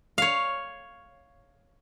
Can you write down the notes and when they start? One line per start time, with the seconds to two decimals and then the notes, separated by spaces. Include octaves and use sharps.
0.18 C#5 F5